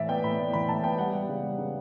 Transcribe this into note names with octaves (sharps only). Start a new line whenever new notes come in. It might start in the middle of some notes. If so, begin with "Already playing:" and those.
Already playing: A2 E3 D5 E5
B3 G5
A2 B5
A2
E3 B5
A2 A5
B3 G5
G3 F#5
G3
C#3
G3
C#3